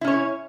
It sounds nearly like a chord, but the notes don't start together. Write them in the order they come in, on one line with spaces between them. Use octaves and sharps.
E4 C#4 C#5